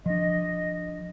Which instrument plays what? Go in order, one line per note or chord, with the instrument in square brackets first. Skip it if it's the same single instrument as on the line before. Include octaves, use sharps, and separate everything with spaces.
[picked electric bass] F3 D4 [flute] D#5